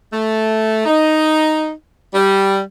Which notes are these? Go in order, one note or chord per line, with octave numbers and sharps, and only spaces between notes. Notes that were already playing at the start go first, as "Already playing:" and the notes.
A3
D#4
G3